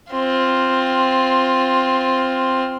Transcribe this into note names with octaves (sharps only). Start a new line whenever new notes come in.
C4 F4